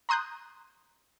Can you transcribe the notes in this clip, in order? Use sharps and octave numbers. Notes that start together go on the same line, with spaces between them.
A#5 C6 D#6 F#6 G6